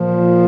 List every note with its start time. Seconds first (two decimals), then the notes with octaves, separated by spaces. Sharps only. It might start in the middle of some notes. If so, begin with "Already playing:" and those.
Already playing: A#2 F3